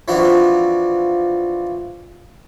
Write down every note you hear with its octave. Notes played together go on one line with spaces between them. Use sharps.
E3 F3 C4 D4 F4 F#4